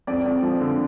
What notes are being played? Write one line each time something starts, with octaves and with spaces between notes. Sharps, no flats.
F2 D5
F2
F3
D3